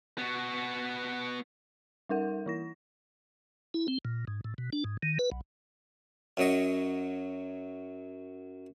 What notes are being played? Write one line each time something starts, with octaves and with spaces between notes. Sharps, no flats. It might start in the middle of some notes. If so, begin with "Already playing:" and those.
B3 F#4
G3 D#4 A#4 F#5
E3 E4 A#6
E4
C4
A#2
G#2
A2
B2
D4
G#2
D#3
B4
B1
F#2 F#3 D#5